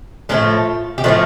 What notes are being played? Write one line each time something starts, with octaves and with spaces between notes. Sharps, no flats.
A2 F3 A3 D4 F4
G4
A2 F3 A3 D4 F4